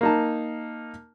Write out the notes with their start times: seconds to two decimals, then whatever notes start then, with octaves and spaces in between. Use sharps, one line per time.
0.01 A#3 D#4 A5